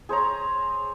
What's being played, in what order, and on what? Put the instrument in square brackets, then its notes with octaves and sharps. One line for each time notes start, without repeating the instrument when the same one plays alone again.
[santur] G#4 C5 C#5 A#5